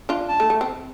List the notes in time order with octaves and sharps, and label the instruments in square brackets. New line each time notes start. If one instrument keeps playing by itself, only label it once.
[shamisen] D4 F4
[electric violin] A5
[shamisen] A3
A3
C4